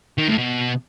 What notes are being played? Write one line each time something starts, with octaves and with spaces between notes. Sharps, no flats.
D#3
A2
B2